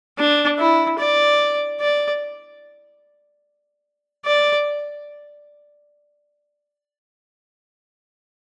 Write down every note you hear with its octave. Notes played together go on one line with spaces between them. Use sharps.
D4
E4
D5
D5
D5